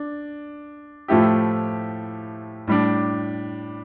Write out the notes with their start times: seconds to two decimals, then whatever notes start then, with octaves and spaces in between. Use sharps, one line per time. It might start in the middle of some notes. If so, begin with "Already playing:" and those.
Already playing: D4
1.08 A2 F3 A3 E4 G4
2.68 A2 G3 D4